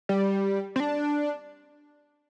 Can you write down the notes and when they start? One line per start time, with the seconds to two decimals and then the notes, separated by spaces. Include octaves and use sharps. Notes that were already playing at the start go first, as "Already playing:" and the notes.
0.09 G3
0.76 C4
0.80 D4